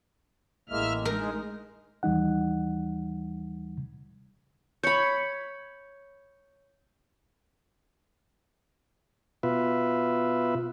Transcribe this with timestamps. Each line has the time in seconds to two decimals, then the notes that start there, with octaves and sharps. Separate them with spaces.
0.69 A1 A2 G#3 A#3 E5 F6
1.05 G#3 D#4 A#4
2.03 D#2 E3 G3 D#4 F#5
4.83 C#5 B5 G6 C#7
9.43 B2 F4 B4 E5